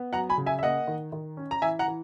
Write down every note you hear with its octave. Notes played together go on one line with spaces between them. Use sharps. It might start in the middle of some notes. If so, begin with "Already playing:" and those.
Already playing: B3
F#3 F#5 A#5
G#5 B5
C#3
E5 G#5
E5
A#3 D#5 F#5
D#3
D#3
C#4
A#5
E3 E5 G#5
F#5 A#5
E3